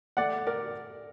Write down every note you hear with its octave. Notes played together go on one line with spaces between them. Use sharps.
A3 D5 F#5
A#4 D5